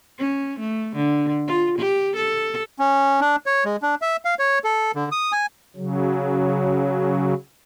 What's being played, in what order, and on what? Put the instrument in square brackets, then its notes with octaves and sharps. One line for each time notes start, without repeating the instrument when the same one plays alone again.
[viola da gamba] C#4
A3
D3
F4
G4
A4
[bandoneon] C#4
D4
C#5
G#3
D4
E5
F5
C#5
A4
D3
D#6
G#5
[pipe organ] C#3 F#3